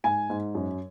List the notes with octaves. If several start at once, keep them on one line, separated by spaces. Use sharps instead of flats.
G#2 G#5
G#2
F#2